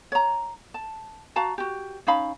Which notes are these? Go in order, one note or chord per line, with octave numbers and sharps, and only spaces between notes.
C#5 A#5
A5
F#4 F5 A5 A#5
F#4 G4
C#4 D#4 F5 B5